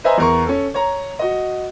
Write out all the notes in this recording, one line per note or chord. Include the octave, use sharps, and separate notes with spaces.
B4 C5 D#5 E5 G#5 A#5
E2 A#4 C#6
C#4 A4
C#5 A#5
F#4 D#5